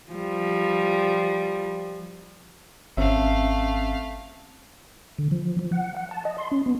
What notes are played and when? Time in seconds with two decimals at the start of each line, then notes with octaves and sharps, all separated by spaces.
0.12 F3 G3
2.97 G#1 A3 C4 C#4 E5 F5
5.19 D3
5.31 F3
5.59 F3
5.72 F#5
5.96 F#5
6.11 A5
6.25 D#5
6.38 C6
6.51 C#4
6.66 B3